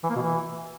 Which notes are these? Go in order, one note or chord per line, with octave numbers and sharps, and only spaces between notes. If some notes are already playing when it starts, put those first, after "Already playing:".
E3
A#3
B2
E3